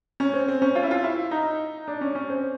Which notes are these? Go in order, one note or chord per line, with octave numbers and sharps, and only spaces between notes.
C#4
C4
C4
C#4
F4
E4
F4
E4
D#4
D4
C#4
C#4
C4